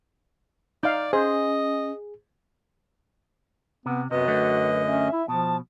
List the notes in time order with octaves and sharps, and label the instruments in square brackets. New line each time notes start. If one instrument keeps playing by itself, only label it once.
[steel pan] D#4 F5 [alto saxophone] D5 [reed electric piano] G6
[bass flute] C#4 [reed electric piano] G#4 [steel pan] C5 [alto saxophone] D#5
[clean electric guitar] C3 [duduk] B3
[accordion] F#2 D#5 [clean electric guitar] C3 B3 [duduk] F#4 [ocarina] B4
[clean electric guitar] D3 A3 [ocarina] B4
[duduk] C#4 [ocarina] E5
[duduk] E4
[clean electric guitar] B2 [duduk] F3 [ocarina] A5